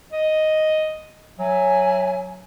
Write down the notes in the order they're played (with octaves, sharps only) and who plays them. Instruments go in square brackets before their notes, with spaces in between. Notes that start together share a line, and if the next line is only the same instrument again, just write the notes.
[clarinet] D#5
[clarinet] F#3 [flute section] E5 G#5